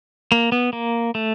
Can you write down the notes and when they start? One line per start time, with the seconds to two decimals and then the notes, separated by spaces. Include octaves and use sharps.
0.32 A#3
0.52 B3
0.73 A#3
1.15 A3